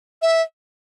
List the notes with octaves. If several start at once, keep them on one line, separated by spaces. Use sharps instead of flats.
E5